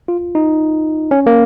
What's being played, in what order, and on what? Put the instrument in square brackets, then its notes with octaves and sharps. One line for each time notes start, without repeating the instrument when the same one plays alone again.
[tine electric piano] F4
D#4
C#4
A#3